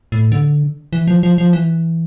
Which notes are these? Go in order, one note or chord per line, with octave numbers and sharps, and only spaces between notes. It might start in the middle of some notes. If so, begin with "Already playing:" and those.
A2
D3
E3
F3
F3
F3
E3